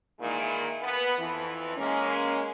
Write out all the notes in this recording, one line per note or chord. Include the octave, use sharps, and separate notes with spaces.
A#2 D#3 E3 G#3 A#3 E4
B3 B4
F2 E3
G#3 A#3 C#4